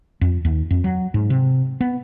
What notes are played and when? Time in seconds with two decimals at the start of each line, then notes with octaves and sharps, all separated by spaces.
0.21 F2
0.45 D#2
0.71 F2
0.84 F#3
1.14 G#2
1.30 C3
1.81 B3